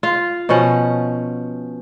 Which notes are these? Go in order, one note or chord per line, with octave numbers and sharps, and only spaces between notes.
F4 F5
B2 F3 C#4 F#5